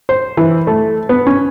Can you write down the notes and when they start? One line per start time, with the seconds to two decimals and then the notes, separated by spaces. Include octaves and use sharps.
0.09 C5
0.37 E3
0.67 A3
1.09 B3
1.27 C#4